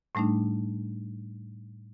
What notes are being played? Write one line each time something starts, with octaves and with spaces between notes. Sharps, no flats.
A2 G3 A3 D4 D#4